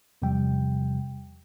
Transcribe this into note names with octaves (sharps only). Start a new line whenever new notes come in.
E2 C3 F3 G3 G5